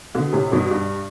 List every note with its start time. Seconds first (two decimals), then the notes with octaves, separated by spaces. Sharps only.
0.15 B2 D3
0.33 A2 C3
0.52 G2 B2
0.71 G2